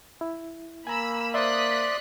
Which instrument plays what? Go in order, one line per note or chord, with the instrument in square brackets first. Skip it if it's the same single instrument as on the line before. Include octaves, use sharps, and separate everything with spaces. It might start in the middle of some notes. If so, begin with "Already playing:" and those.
[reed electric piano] E4
[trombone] A#3 [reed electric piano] G#5 A#5 [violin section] B5 E6
[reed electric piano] C5 E5 [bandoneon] D5 C6 [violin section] D#6 F#6 B6